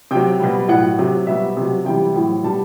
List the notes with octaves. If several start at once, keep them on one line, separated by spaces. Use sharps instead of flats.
C3 F#3 G5
B2 G3
A2 F#3 F#5
C3 F#3
B2 G3 E5
C3 F#3
C3 E3 G3 G5
A2 F#3
B2 G3 A5